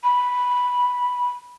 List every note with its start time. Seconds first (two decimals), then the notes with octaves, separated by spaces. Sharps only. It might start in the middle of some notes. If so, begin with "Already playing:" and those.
0.04 B5